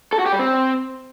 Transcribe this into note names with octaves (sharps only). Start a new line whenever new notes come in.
A4
F#4
G4
G3
C4